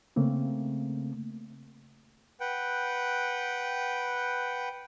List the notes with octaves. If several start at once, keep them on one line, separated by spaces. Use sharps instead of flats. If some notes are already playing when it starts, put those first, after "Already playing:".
C#3 A3 A#3 C4
B4 F#5 G5